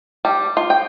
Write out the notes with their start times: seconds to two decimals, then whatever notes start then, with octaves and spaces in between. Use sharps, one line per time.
0.25 G3
0.57 F4
0.70 G5